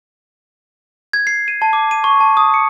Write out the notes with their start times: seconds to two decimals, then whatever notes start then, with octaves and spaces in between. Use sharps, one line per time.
1.13 G#6
1.27 C7
1.48 D#7
1.62 A5
1.73 D6
1.91 D#7
2.04 C#6
2.20 A5
2.37 D#6
2.54 C#7